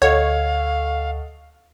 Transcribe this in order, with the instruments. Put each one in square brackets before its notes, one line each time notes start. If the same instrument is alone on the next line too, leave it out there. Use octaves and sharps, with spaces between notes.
[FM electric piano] D2 C#6 [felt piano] A4 D#5 F#5 [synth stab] C#5 [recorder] F5